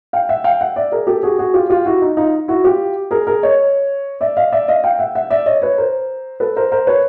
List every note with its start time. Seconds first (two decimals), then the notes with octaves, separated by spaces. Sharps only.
0.13 F5 G5
0.29 E5 F#5
0.44 F5 G5
0.61 E5 F#5
0.76 D5 E5
0.92 G#4 A#4
1.07 G4 A4
1.23 F#4 G#4
1.39 F#4 G#4
1.54 F4 G4
1.70 F4 G4
1.86 E4 F#4
2.02 D#4
2.17 D#4 F4
2.48 E4 F#4
2.64 F4 G4
3.11 G#4 A#4
3.27 G#4 A#4
3.43 C#5 D#5
4.21 D5 E5
4.37 D#5 F5
4.52 D5 E5
4.68 D#5 F5
4.84 F5 G5
4.99 E5 F#5
5.15 E5 F#5
5.30 D5 E5
5.46 C#5 D#5
5.62 B4 C#5
5.78 A#4 C5
6.40 A4 B4
6.56 A#4 C5
6.72 A#4 C5
6.87 B4 C#5